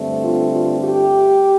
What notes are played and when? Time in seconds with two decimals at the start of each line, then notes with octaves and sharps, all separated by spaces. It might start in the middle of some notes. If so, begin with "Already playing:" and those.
Already playing: G2 D3 A3 C4
0.23 F4
0.53 F4
0.84 G4